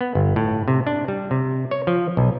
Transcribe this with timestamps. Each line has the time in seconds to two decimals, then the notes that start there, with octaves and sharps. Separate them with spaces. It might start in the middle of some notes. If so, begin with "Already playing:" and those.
0.01 B3
0.15 G1
0.36 A2
0.68 C3
0.87 D4
1.08 G3
1.31 C3
1.71 C#5
1.87 F3
2.17 B1